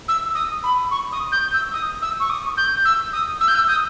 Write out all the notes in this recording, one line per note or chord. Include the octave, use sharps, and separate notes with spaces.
E6
D#6
B5
C#6
D#6
G6
E6
D#6
E6
C#6
D#6
G6
E6
D#6
E6
G6
E6
D#6